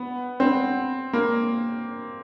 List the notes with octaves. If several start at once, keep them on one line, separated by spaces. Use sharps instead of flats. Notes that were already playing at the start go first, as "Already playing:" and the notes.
Already playing: B3
C4
A#3